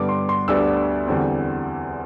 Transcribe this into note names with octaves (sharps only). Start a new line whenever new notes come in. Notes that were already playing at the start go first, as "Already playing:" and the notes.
Already playing: G2 D3 G3 B3 D6
C6
C6
D2 D3 G3 B3 D4 E6
E2 D3 G3 C4